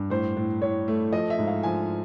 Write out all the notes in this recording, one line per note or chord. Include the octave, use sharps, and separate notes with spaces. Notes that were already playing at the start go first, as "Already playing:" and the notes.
Already playing: G2
A2 C5
A2
A2 C#5
A3
F3 D#5
E5
G#2
F5
F3 G#5